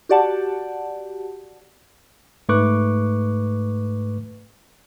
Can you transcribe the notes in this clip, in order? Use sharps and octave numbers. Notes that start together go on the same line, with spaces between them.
F#4 G4 D5 F#5 A5
G#2 A3 B4 C#6 D6 F#6